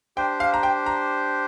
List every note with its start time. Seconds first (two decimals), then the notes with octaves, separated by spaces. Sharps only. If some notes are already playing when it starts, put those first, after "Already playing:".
0.17 D4 G4 C5 G5
0.40 F5
0.54 A#5
0.63 G5
0.86 A#5